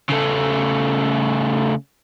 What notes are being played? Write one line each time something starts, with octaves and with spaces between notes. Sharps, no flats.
C#3 A3